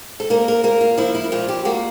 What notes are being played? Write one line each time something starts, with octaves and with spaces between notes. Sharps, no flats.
A4
A#3 A#4
A#4
A#3 A#4
F4
F3 E4
E4
A#2 F4
G4
A#3 F#4